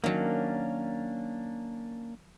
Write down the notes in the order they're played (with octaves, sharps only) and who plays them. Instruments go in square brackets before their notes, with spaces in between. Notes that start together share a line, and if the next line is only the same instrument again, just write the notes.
[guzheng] D#3 F#3 [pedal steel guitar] A#3 C#4 D4